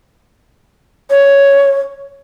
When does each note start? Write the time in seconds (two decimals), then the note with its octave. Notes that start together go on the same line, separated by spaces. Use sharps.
1.10 C#5